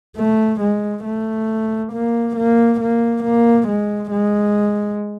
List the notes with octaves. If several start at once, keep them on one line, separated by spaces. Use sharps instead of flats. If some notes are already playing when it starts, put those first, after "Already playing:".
A3
G#3
A3
A#3
A#3
A#3
A#3
G#3
G#3